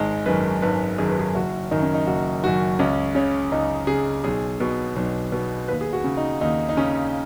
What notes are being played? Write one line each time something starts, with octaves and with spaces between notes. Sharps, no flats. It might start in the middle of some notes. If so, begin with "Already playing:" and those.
Already playing: G#1 G#3
F#2 D#3 B4
G#1 B4
F#2 D#3 G#4
B4
G#4
F#1 F#4
F#2 D#3 D#4
C#4
D#4
F#1 F#4
F#2 D#3 F#4
C#2 C#4
C#3 C#5
C#2 D#4
C#3 G#4
B1 G#4
B2
B1
B2
D#2 B4
G#4
F#4
C#3
D#4
D#2 D#4
D#4
C#3 C#4